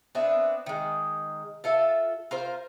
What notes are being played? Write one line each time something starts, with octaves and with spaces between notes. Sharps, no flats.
B3 C4 D4 E5
D#3 G#3
F4 A4 E5
F4 A#4 C5